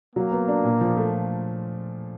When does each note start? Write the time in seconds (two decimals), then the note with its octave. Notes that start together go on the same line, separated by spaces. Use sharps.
0.15 F#3 A#3
0.32 B3
0.48 D4
0.64 A#2
0.81 F3
0.97 A3